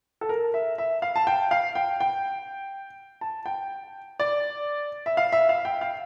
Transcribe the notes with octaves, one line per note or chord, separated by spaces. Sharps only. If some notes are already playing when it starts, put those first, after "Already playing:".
A4
A#4
E5
E5
F5
A5
G5
F5
G5
G5
A5
G5
D5
E5
F5
E5
F5
G5
F5